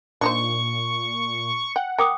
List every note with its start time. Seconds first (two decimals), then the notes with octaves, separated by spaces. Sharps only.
0.21 A#2 D4 D#4 C5 C#6
1.76 F#5 G5
1.98 A#4 G5 D6 D#6